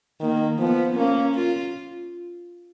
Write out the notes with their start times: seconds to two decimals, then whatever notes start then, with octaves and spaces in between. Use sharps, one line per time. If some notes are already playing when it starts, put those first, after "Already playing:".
0.21 D#3 A#3
0.59 F3 B3
0.96 A#3 C#4
1.35 F4